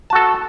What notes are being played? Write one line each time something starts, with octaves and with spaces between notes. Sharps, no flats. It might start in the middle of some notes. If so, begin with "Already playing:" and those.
F#4 A4 A5